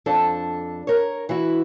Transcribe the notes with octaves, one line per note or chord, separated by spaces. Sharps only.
F2 D4 A4
A#4 C#5
E3 E4 F#4